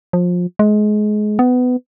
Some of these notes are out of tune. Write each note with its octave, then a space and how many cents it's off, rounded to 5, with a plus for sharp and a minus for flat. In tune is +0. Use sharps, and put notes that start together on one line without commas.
F3 +25
G#3 +25
B3 +20